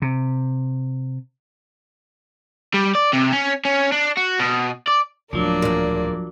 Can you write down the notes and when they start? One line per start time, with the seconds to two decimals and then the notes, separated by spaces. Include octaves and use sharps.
0.02 C3
2.74 G3
2.95 D5
3.13 C3
3.32 C#4
3.65 C#4
3.92 D4
4.17 F#4
4.40 B2
4.87 D5
5.33 D1 F3 F#3 A#3 D4
5.62 E2 A#2